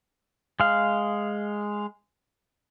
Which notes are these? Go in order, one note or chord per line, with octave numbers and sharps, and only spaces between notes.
G#3 F5